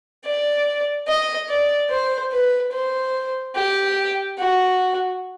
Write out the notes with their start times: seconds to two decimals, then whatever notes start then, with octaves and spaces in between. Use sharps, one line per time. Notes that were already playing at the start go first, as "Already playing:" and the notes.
0.25 D5
1.07 D#5
1.49 D5
1.90 C5
2.31 B4
2.72 C5
3.55 G4
4.38 F#4